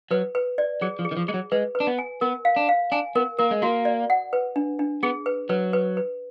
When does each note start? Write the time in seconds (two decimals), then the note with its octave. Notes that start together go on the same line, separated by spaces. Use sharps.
0.11 F#3 B4
0.35 B4
0.58 D5
0.81 F#3 G#4
0.99 F3
1.05 G#4
1.11 D#3
1.17 F3
1.28 G#3 G#4
1.34 F#3
1.52 G#3 B4
1.75 B4
1.80 D4
1.87 B3
1.99 G#5
2.21 B3 A#4
2.45 F5
2.56 D4
2.69 F5
2.92 D4 G#5
3.15 B3 A#4
3.39 A#3 A#4
3.51 G#3
3.62 A#3 F#4
3.85 D5
4.10 F#5
4.33 B4
4.56 D4
4.79 D4
5.03 B3 G#4
5.26 B4
5.49 F#3 B4
5.73 B4
5.97 B4